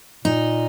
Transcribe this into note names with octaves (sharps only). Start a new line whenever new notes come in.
A#2 D#4